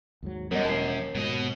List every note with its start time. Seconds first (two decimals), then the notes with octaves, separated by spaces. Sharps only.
0.23 D#2 G#2 F#3
0.51 F#2 F#3 G3 B3 C#4 A#4 D#5
0.65 E1 D#2 A#4 A5 C7
1.15 G#2 B2 F#3 D#5